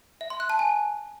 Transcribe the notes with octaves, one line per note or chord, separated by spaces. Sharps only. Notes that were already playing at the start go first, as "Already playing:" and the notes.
E5
C6
F#6
A5
G#5